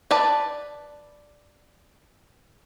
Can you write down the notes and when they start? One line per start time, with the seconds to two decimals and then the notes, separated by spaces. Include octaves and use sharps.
0.11 B4 D5 A5